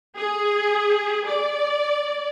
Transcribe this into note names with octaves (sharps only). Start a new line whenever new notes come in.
G#4
D5